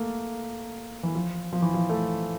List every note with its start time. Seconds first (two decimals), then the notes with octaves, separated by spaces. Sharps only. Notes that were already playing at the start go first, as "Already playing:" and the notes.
Already playing: A3 A#3
1.03 E3
1.15 F3
1.53 F3
1.62 E3
1.74 F3
1.89 A3